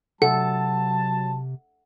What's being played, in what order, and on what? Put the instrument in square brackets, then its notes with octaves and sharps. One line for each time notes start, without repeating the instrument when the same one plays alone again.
[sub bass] C3 [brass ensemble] F#3 A5 [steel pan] A4 [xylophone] F#5